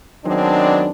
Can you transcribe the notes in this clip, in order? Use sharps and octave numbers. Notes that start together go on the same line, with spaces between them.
D#3 F#3 G#3 B3 C4 D4